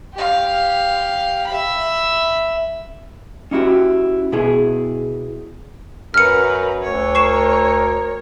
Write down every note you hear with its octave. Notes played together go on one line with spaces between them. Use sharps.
G4 F5
E5 B5
C#4 D#4 E4 F#4 G4
B2 E4 G#4
F#2 A#4 B4 F6 C#7
D2 C#5
A#4 C#6 C7 E7